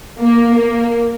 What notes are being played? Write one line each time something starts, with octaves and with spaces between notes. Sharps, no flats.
A#3
A#3